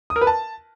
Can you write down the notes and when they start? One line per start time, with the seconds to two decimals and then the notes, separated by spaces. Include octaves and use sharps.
0.10 D#6
0.16 A#4
0.21 B4
0.27 A5